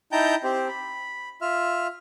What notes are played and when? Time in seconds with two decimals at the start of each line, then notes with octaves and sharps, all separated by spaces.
0.12 D#4 E4 G5 A5 A#5 G6
0.44 C4 G4 C5
0.68 B5
1.41 F4 E5 F6